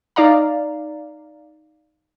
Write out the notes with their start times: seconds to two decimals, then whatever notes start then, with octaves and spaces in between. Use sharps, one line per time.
0.16 D#4 D5 F5 A#5